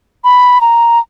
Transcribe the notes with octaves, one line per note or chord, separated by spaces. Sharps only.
B5
A#5